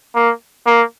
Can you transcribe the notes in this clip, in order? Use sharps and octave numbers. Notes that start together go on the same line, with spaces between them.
A#3
A#3